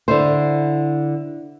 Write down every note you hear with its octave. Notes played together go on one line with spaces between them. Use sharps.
D3 E4 C5